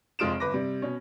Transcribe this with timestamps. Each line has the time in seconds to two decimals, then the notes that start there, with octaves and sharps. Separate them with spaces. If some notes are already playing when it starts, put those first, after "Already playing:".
0.19 F1 G#3 F4 D#6 D7 E7
0.40 G1 B4 D6 A#6
0.54 C3 G3
0.82 B2 C#4